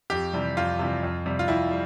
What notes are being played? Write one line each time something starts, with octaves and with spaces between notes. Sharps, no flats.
F2 G4
C3 E3 G3
F2 F4
C3 E3 G3
F2
C3 G3
F4
F2 E4
G3